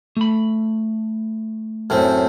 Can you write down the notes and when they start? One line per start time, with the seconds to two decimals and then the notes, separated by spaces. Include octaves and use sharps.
0.17 A3 B5
1.90 F#2 A2 C4